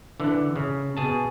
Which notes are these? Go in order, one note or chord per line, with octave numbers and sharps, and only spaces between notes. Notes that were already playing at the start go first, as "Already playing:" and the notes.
D3 E3
C#3
B2 G#4 A5